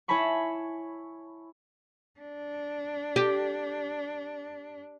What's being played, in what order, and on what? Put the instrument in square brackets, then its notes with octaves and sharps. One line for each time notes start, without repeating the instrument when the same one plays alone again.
[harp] E4 C#5 G#5 A5 B5 C#6
[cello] D4
[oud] G4